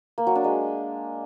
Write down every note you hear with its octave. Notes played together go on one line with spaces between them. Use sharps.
A#3
F#3
D4
G#3